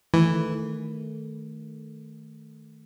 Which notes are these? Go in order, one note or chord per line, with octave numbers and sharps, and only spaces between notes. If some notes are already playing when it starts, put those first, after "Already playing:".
D#3 E3 A3